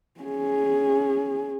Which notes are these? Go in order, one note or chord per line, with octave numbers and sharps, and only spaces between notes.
C#4 G#4